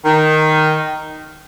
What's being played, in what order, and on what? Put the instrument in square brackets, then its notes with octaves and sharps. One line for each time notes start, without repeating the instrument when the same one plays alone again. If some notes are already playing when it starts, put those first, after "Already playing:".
[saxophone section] D#3